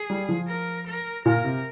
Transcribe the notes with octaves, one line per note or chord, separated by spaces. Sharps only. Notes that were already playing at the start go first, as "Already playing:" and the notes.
Already playing: G#4
G3
F3
A#4
A#4
A#2 A#4
C3